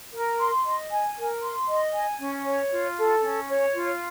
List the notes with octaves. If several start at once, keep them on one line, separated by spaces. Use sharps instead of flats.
A#4
C6
D#5
G#5
A#4
C6
D#5
G#5
C#4
C#5
F4
A4
C#4
C#5
F4